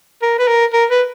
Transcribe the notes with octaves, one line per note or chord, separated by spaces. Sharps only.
A#4
B4
A#4
A#4
B4